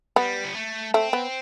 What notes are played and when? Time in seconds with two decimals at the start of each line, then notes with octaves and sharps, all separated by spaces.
0.16 G3 B3
0.44 B3
0.55 A3
0.94 A3 C4
1.13 B3